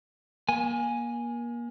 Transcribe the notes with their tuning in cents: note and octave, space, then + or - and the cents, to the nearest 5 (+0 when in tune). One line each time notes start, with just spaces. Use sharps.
A#3 +30 G#5 +0